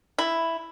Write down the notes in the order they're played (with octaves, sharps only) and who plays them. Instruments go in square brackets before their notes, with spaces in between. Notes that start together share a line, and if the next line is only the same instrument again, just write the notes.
[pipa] E4